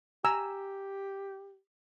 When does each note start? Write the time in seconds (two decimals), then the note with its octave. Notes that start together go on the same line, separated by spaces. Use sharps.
0.25 G4 G#5 A#5 E6